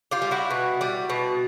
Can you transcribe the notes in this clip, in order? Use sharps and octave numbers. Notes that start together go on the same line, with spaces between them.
F4 G4
G3
E4 F#4
B2
G3
B2